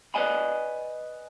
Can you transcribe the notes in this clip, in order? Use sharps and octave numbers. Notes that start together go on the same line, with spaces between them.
B4 C5 D5 D#5 G#5 B5